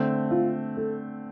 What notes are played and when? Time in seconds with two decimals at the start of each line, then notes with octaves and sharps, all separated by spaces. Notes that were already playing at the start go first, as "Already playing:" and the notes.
Already playing: D3 A3 C4
0.31 F4
0.77 A4